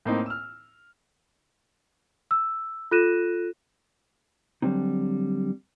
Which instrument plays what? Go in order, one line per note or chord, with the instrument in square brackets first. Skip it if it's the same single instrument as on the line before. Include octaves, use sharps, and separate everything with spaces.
[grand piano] A2 A#3 C4 D#4
E6 F6
[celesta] E6
F4 A4 F#6 A#6 D#7 E7
[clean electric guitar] D3 F#3 G3 C4 D#4